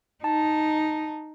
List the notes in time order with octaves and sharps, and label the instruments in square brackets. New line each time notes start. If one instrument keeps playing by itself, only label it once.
[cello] D#4 [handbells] A5